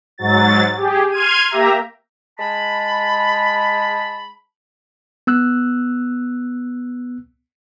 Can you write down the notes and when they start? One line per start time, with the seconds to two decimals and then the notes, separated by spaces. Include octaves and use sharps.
0.18 G#2 F#3 A6
0.77 G4 G#4
1.11 C6 F6 G#6 D#7
1.50 A#3 G4 E5 A#5
2.39 G#3 A5 B5
5.27 B3 E6 F#6